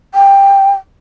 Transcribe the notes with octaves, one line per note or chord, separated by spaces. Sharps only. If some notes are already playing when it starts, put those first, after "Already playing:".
G5